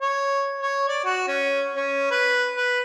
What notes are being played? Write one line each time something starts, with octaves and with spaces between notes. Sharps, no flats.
C#5
C#5
D5
F#4
C#4
C#4
B4
B4